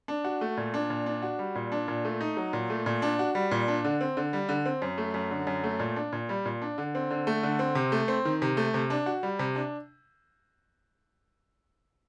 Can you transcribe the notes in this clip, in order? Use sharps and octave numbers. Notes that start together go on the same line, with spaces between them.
D4
F#4
A3
A#2
D4
A#2
D4
F#4
G3
A#2
D4
A#2
A3
D#4
F#3
A#2
A3
A#2
D4
F#4
G3
A#2
D4
D3
C4
D3
G3
D3
C4
F#2
A3
F#2
D3
F#2
A3
A#2
D4
A#2
G3
A#2
D4
D3
C4
D3
A3
D3
C4
C3
A3
C4
D#3
C3
A3
C3
D4
F#4
G3
C3
D4